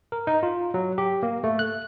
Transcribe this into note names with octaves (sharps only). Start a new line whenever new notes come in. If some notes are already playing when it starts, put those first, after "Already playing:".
A#4
D#4
F4
F#3
G4
A#3
A3
F#6